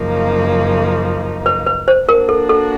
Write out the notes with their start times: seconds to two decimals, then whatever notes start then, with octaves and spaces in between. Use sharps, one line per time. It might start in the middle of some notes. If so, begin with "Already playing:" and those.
Already playing: F#2 C#3 F3 A#3 D#4
1.46 B4
1.67 B4
1.88 C5
2.08 A#3 D4 F#4 A#4
2.29 A4
2.49 A4